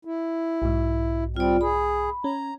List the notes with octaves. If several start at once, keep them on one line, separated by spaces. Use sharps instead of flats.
E4
B1 G#2
G3 C4 F4 D5
G#4 B5
C#4 A#5